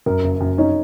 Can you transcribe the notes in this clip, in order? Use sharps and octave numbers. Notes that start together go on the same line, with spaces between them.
F#2 A#4
F#1
F#2
C#4 D#4